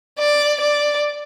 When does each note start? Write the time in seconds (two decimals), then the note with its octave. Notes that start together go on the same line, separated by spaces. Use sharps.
0.19 D5
0.61 D5